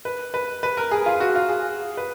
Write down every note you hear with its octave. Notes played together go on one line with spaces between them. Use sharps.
B4
B4
B4
A#4
G#4
F4
F#4
F4
G#4
B4